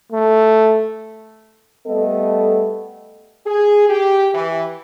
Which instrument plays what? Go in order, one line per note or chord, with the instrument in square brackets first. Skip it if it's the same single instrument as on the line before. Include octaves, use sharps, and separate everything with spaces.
[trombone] A3
[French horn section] G3 A3 B3 A4 D#5
G#4
G4
E3